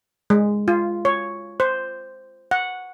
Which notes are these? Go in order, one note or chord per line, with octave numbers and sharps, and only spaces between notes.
G#3
F4
C#5
C5
F#5